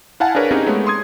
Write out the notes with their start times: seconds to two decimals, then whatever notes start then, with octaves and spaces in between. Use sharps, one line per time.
0.20 E4 F5 F#5 G#5 A5
0.35 D4 G#4 A#4 B4 C#5
0.51 C4 C#4 D#4 G4 G#4
0.67 G#3 A3 B3 C#5
0.87 C6 D#6 G#6